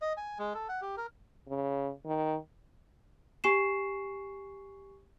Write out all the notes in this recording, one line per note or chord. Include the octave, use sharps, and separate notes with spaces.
D#5
G#5
G#3
A4
F#5
G4
A#4
C#3
D#3
G4 G#5 C#6 C7 E7